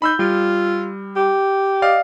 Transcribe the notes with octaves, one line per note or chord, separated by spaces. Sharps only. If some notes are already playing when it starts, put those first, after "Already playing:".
D#4 B5 E6 G6
G3 F4
G4
D5 D#5 F5